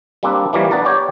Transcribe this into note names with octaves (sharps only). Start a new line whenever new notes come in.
G3 A#3 C4 D4
E3 F3 G3 A#3 C#4
B3 D4 A5 A#5
G4 C#5 D5 G5